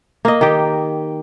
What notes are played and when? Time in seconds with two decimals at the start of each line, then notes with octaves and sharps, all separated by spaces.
0.25 A#3 D#5
0.41 D#3 G4